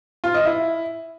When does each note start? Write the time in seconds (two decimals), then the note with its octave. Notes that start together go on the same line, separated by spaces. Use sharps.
0.24 F4
0.35 D#5
0.45 E4